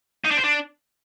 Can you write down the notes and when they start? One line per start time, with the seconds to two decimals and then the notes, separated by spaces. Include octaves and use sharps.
0.24 D#4
0.31 D4
0.37 C5
0.44 D4